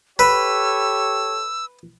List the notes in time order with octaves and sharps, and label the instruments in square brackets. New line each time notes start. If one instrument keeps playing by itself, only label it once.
[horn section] G4 A4 C#5 [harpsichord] B4 [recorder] E6